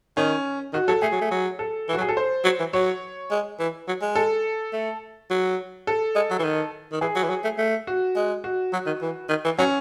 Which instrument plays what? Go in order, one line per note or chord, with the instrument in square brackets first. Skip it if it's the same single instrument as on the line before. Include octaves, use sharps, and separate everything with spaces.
[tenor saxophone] D#3 [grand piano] C#4
[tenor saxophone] D#3 [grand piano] F#4
[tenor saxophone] F#3 [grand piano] A4
[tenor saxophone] A3 [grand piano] G#4
[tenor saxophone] F#3
A3
F#3
[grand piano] A4
[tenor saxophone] E3
[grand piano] F#4
[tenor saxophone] F#3
[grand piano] G#4
A4
C5
[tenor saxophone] F#3
E3
[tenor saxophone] F#3 [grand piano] C#5
[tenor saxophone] G#3
E3
F#3
G#3
[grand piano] A4
[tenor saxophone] A3
F#3
[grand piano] A4
[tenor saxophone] G#3
F#3
E3
D#3
D#3
[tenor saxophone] E3 [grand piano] G#4
[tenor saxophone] F#3
E3
F#3
A3
A3
[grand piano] F#4
[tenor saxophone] G#3
[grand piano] F#4
[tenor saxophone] F#3
D#3
E3
D#3
E3
[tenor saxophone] F#3 [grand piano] C#4